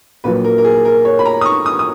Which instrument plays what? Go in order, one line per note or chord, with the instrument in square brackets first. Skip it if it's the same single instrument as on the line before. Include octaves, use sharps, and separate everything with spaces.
[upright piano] A#1 A#2 F#3 B4
A#4
A#4
G#4
A#4
C#5
B5
A#5
D#6
C#6
D#6
D#6